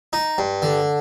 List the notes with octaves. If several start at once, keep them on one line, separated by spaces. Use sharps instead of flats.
D#4
G2
D3